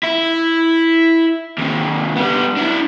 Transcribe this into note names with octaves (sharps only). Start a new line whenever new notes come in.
E4
D#2 C3
G3 B3
D4 E4